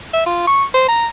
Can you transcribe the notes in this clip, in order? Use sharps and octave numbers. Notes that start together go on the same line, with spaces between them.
E5
F4
C#6
C5
A#5